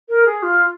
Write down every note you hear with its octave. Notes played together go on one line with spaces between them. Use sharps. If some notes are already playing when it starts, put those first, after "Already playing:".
A#4
G#4
F4